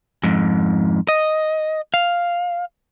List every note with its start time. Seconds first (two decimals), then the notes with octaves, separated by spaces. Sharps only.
0.23 F2 G#2
1.08 D#5
1.94 F5